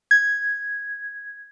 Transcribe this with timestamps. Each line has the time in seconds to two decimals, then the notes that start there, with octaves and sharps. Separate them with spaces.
0.11 G#6